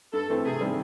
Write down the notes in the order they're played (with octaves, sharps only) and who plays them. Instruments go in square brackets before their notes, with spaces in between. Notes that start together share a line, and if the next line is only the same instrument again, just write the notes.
[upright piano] G2 [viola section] A4
[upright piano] E3 A3 C4
[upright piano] C3 [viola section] G#4
[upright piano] D#3 G3 C4